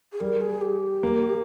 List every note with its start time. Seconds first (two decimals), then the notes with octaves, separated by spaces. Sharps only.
0.12 G#4
0.20 G3 A#4
0.41 G#4
0.61 G4
1.03 A#3